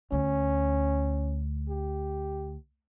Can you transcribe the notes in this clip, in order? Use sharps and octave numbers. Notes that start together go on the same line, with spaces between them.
D2 C#4
G4